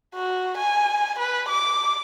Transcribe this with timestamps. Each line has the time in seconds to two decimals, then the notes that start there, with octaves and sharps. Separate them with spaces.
0.15 F#4
0.57 G#5
1.19 B4
1.49 D6